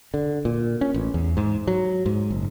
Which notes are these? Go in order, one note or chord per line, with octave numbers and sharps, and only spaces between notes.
D3
A#2
C#4
A1
E2
G#2
F#3
G#2
F#1